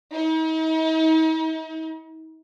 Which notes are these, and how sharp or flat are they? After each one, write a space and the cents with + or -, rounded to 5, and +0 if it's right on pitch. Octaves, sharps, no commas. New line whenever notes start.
D#4 +45